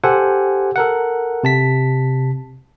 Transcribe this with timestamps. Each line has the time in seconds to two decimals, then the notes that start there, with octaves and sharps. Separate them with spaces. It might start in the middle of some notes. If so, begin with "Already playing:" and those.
0.04 G4 A4 C5 F#5 G#5
0.76 A4 A#4 F#5
1.44 C3 A5 B6